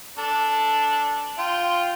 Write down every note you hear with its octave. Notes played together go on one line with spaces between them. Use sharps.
D4 A4
F4 G5 C6